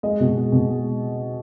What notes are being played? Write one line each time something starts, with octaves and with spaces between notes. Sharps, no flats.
G#3 D#5
B2
G#3
B2
G#3